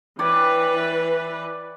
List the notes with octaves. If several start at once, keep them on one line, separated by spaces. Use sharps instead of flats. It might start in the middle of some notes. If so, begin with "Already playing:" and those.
E3 B4 C#5 D5 G5